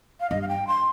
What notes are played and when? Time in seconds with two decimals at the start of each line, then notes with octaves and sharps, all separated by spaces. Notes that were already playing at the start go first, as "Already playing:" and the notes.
0.20 F5
0.30 G2 D#5
0.42 F5
0.48 G5
0.67 C6